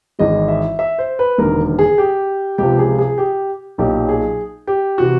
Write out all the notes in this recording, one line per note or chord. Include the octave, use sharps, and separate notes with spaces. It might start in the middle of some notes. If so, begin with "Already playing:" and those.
G#1 G#2 E3 G#3 D#5
E5
E5
C5
B4
E1 D#2 D3 A#4
G#4
G4
C#2 C3 F3 G4
G#4
G#4
G4
B1 A#2 F#3 G4
G#4
G4
C3 E3 F#4